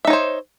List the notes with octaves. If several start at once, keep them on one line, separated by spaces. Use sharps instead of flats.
D#4 C5 C#5 E5